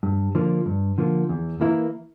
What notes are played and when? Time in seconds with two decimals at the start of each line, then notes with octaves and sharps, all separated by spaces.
0.03 G2
0.35 D3 F3 A#3
0.66 G2
0.98 D3 F3 A#3
1.29 E2
1.61 E3 A#3 E4 A#4